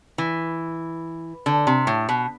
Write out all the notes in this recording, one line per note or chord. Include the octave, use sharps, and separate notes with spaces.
E3
D3
C3
A2
B2